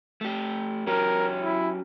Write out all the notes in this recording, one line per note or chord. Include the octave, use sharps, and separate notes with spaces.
A3 G4
F#3 C#4 G4 A#4
E4